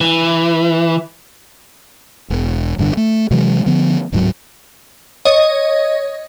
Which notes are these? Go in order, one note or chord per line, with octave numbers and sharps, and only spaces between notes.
E3
E1
F1 G2 B2 D3
A3
C3 E3 F#3 G#3
D3 F3 B3
D1 G#2 F#3
C#5 D#5